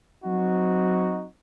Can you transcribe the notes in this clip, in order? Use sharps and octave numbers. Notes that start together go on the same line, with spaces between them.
F#3 C4 D#4 F#4